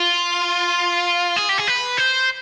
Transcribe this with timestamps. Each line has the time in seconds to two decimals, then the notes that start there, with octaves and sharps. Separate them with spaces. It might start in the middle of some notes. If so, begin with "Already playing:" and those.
Already playing: F4
1.36 G#4
1.49 G4
1.58 G#4
1.67 B4
1.97 C5